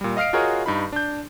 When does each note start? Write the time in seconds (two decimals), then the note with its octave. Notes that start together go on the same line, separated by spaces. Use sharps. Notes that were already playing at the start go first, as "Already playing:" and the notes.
0.01 A#2 G3
0.17 D#5 F5 F6 C7 D7
0.33 F4 F#4 G#4 A#4 C#5 D#5
0.66 G2 D#4 B5
0.92 D4 G6